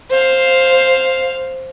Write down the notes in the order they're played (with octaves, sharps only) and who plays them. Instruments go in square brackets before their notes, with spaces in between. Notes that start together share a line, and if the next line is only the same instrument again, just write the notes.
[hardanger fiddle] C5 F5